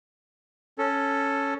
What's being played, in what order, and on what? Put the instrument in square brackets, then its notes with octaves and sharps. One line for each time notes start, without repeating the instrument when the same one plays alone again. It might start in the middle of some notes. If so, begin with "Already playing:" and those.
[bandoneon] C#4 A4